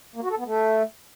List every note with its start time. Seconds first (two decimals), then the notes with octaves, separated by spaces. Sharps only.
0.16 A#3
0.23 F#4
0.31 A4
0.38 B3
0.45 A3